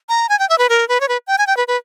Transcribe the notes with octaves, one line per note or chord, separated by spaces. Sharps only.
A#5
G#5
G5
E5
B4
A#4
B4
C#5
B4
G5
G#5
G5
B4
B4